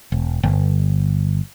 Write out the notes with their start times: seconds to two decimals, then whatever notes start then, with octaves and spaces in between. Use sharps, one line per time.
0.12 E1
0.43 G1